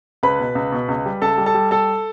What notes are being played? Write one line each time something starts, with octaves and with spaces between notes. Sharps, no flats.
C#2 B4 B5
B2
C#2
B2
C#2
G3
C#2 A4 A5
G3
A4 A5
G3
G3 A4 A5